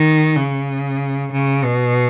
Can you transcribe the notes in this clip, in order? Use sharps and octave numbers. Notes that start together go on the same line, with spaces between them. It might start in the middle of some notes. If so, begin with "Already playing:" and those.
Already playing: D#3
C#3
C#3
B2